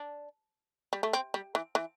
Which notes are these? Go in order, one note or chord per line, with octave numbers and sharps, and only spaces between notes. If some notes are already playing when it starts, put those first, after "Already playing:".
Already playing: D4
G3
A3
C4
G3
E3
E3